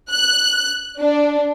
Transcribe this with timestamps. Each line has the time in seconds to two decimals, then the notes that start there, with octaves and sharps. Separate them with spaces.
0.11 F#6
1.00 D4